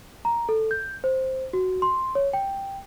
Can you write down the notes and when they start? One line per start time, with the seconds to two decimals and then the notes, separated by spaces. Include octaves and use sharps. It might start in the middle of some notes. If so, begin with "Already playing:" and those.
0.25 A#5
0.49 A4
0.71 G6
1.04 C5
1.53 F#4
1.82 C6
2.15 C#5
2.33 G5